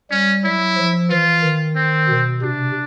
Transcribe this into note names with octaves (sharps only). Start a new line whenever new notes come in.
G3 C#4
F#3 E4
F3
E3 F4
D#3
C4
B2
C3 D4